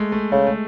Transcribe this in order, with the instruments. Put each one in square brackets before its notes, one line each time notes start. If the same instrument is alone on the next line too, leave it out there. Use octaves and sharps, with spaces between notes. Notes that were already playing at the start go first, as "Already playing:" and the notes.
Already playing: [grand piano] G#3 A3
A3
[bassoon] C#3 [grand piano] A3
[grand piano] A3